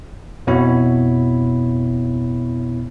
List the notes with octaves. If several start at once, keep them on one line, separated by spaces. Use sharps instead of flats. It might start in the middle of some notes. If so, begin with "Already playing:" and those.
F2 B2 B3 E4 C#5 B5